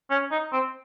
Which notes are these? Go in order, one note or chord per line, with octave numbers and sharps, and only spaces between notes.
C#4
D#4
C4